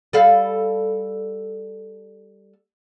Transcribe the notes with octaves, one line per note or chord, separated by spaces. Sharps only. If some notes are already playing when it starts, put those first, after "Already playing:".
G3 A4 F5